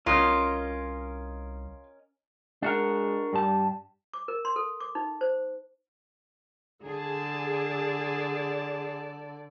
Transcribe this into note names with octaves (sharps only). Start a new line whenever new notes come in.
C2 C#4 F4 A#4 D#5
G#3 D4 F#4 A#4
G2 G3 A5
D6
A#4
C6
A4
D6
D#4
C5
D3 G#4 D5 A5